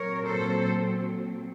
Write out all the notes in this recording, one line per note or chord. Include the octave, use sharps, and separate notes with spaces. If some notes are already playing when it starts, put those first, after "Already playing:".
Already playing: A#2 F#3 C4 A#4 C#5
A4 C5